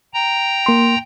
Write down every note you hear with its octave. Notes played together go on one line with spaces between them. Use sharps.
G5 A#5
A#3 C6